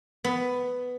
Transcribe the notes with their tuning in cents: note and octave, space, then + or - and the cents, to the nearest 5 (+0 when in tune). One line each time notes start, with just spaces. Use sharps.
B3 +10